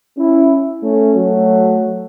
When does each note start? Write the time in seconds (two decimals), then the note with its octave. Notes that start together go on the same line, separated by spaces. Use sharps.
0.17 C#4 E4
0.83 A3 C#4
1.15 F#3 A3